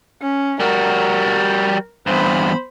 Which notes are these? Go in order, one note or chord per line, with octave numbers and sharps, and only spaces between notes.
C#4
G3 F#4 A#4
E2 G2 C5 B5